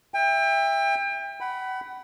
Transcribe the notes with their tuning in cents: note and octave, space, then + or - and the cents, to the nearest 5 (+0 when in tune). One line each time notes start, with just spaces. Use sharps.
E5 +0 G5 +35
F#5 +35 B5 +0